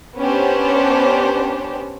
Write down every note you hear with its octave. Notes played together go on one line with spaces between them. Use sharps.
B3 C#4 D4 G4 C5